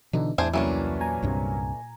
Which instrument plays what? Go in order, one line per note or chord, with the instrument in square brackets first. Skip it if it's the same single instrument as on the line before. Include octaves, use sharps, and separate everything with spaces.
[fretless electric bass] B2 D3 E3 [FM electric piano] D4 D#4
[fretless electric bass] E2 [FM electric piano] A2 E4 [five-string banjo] D4 G#4 C5
[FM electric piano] C2 E4 [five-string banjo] E3 A3 D4 [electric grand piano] F#3 A#3 C#4
[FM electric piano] A#2 G#5 A#5
[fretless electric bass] C2 G2 C3